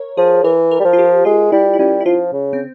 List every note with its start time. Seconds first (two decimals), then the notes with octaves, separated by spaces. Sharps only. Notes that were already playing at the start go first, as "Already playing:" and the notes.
Already playing: A#4 C#5
0.17 F3 G#4
0.44 E3 A#4
0.71 A#4
0.80 G3
0.85 F3
0.93 F4
0.98 G4
1.25 G#3 F4
1.52 G3 E4
1.74 E4
1.79 G3 C#4
2.00 E4
2.05 F3 F4
2.33 C#3
2.53 C4